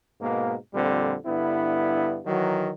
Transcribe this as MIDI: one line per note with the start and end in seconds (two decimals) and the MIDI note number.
0.21 0.55 44
0.21 0.55 47
0.21 0.55 58
0.74 1.15 41
0.74 1.15 46
0.74 1.15 50
0.74 1.15 55
0.74 1.15 60
1.26 2.20 43
1.26 2.20 50
1.26 2.20 59
1.26 2.20 64
2.25 2.71 51
2.25 2.71 52
2.25 2.71 54